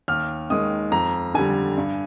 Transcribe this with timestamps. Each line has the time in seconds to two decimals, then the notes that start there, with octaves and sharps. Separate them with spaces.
0.08 D#2 F6
0.50 D#3 G#3 D#6
0.92 F2 A#5
1.34 D3 G3 G#5
1.77 G2